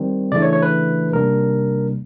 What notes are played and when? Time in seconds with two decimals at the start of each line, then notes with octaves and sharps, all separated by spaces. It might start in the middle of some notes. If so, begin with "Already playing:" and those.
Already playing: D#3 G3 C4
0.32 C#3 E3 A3 D4 D5
0.42 C#5
0.53 C#5
0.62 B4
1.13 C3 D#3 G3 A#3 D4 A#4